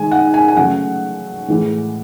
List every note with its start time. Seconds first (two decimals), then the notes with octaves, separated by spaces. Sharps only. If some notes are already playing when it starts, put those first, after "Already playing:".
Already playing: D#3 G#3 G#5
0.12 F#5
0.34 G#5
0.48 G#5
0.57 C#3 F#3 A3 F#5
1.48 A2 E3 G#3